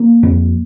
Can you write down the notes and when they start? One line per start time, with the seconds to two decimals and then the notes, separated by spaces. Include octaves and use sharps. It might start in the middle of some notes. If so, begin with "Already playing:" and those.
Already playing: A#3
0.23 F2